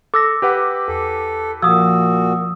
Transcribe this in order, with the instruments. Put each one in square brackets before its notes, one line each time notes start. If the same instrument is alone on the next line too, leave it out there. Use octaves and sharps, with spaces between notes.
[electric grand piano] A4 [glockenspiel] D6 E6 A#6
[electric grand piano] G4 B4 F#5
[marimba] E2 [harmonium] A4
[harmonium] A#2 F#4 [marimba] F3 [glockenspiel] D#6 E6